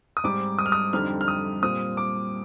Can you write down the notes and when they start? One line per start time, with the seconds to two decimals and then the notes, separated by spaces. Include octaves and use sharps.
0.17 D#6
0.24 G#2 G3 C4 D#4 D6
0.59 D#6
0.66 F6
0.72 D#6
0.93 F2 D3 G3 C4 D#4 F6
1.21 F6
1.28 D#6
1.63 A#2 G3 C4 D#6
1.97 D6